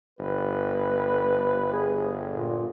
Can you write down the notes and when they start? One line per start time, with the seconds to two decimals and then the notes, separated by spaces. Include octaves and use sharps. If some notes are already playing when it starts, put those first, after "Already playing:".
0.19 G1 B4
1.73 G#4
2.31 A#2